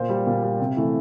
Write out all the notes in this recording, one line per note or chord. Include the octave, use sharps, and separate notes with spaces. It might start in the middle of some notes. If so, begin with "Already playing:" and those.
Already playing: A#2 C5
G3
A#2
G3
C3
E3 A3